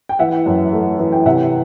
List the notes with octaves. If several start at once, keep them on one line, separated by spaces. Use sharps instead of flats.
G5
E3 E5 F#5
F#2
A3
E3
G5
C3 E5 F#5